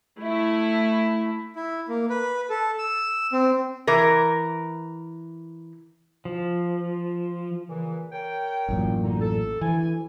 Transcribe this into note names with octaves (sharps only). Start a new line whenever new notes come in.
A3 E4
E4
A#3
B4
A4
E6
C4
E3 A#4
F3
A#2 C#3 E3
A#4 C#5 G5
A1 F#2 A#2
D3 D#4
A4
D2 E3 E4 G#5